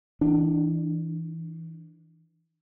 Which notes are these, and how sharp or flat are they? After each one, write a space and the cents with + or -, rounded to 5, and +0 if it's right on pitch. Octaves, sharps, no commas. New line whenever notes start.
E3 -15 D4 +15